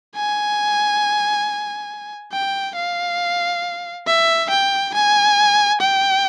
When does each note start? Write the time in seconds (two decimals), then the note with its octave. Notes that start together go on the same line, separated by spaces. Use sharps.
0.16 G#5
2.32 G5
2.76 F5
4.07 E5
4.50 G5
4.94 G#5
5.81 G5